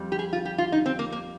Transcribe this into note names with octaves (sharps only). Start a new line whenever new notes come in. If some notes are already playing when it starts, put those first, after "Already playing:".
Already playing: F2 G3
G4
G#4
F4
G4
F4
D#4
C4
A#3
A#3